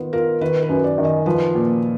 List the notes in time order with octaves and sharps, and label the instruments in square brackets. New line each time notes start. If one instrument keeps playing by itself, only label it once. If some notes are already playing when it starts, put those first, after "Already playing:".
Already playing: [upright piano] D#3 B3 F4
[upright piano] F4 [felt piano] A#4
[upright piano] D#3 [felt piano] B4
[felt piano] B4
[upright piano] F#2
[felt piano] D5
[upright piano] D#3
[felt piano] D#5
[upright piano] F3 [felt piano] B4
[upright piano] A#2